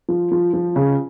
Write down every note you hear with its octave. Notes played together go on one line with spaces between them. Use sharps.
F3
F3
F3
C#3